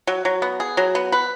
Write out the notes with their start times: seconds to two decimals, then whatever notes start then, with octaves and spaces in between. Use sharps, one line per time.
0.07 F#3
0.25 F#3
0.42 B3
0.60 G#4
0.77 F#3
0.95 B3
1.12 B4